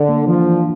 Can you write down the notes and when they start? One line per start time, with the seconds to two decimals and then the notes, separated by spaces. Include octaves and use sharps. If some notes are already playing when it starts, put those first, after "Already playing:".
Already playing: D3 D4
0.09 A#3
0.27 E3 F3
0.46 E3